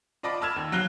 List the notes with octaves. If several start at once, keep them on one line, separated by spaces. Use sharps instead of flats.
F4 D5 D#5 A5 B5 D6
A5 B5 E6 F6 G#6 E7
D#2
F#3 F5 F#6 G7